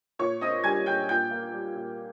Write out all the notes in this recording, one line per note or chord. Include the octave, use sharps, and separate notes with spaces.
A#2 C#5 C#6
C4 D#5 D#6
G3 G#5 G#6
A#2 G5 G6
A#2 G5 G6
A#3
G3
A#2